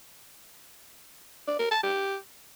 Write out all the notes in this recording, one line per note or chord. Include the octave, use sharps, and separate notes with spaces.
D5
A#4
A5
G4